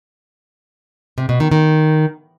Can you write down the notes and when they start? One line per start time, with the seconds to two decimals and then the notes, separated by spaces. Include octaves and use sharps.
1.18 C3
1.29 B2
1.40 D#3
1.52 D#3